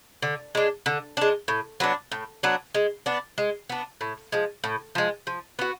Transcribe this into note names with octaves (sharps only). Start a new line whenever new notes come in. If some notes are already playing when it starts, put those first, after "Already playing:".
D3
G#3 D4
D3
G#3 D4
A2
F#3 B3 D4
A2
F#3 B3 D4
G#3
B3 D4
G#3
B3 D4
A2
F3 G#3
A2
F3 G#3
F3
B3 F#4